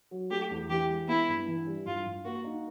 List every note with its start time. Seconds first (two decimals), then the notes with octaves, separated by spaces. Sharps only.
0.11 F#3
0.31 A3 G4
0.50 E2
0.69 E3 G4
0.89 G#3
1.08 B3 E4
1.28 G2
1.48 E3
1.67 G3
1.86 G2 F4
2.06 G2
2.25 A#3 F#4
2.44 D#4